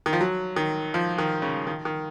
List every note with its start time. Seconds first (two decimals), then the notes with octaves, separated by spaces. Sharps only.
0.06 D#3
0.13 F3
0.21 F#3
0.56 D#3
0.94 F3
1.18 D#3
1.42 C#3
1.67 D#3
1.85 D#3